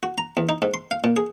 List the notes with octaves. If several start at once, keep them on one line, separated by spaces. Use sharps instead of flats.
F#4
A#5
E2
D#4
G#2
C6
F5
A#2
G#4